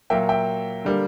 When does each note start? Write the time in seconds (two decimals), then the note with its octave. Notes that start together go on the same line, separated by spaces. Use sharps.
0.10 A#2 F#3 A#3 E5 G5
0.29 E5 G5
0.85 D3 G3 A#3